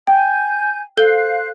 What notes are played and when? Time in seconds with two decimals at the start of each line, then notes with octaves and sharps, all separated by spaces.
0.07 G5 G#5 G6
0.97 A4 C5 F5 F#6 G6 G7